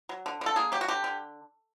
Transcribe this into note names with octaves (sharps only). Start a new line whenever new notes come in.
F#3
D3
D3 A4
A#3 G#4
F#3 G4
F#4
D3 G4
D3